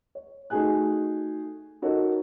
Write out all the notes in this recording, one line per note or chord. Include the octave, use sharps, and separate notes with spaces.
C#5
A3 D#4 F#4 G#4 G#5 F#6
D#4 F#4 A4 A#4 C#5 D#5